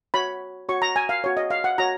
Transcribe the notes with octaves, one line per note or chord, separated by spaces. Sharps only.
F#4 C#5 B5
F#4 C#5 C#6
A#5
G#5
F5
F#4 C#5
D#5
F5
F#5
F#4 C#5 A#5